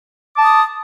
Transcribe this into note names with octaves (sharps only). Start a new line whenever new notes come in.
A5 D6 D#6